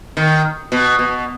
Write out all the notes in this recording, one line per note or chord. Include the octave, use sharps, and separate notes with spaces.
D#3
B2
B2